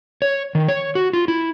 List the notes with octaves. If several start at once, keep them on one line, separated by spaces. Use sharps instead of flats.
C#5
D#3
C#5
F#4
F4
E4